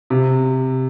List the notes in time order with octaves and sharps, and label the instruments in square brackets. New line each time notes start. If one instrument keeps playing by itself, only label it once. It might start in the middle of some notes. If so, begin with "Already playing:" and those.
[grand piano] C3